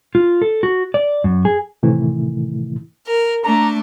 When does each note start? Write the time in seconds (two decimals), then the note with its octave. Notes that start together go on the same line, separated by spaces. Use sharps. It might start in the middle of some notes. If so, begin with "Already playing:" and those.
0.15 F4
0.42 A4
0.63 F#4
0.94 D5
1.24 F#2
1.45 G#4
1.83 A2 C3 D#3 E3 A3 E4
3.08 A#4
3.45 A3 D4 A#5